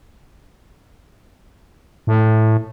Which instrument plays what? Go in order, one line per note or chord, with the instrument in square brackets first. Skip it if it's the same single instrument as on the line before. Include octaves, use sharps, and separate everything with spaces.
[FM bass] A2